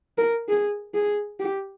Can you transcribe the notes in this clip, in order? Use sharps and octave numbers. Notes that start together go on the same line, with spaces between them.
A#4
G#4
G#4
G4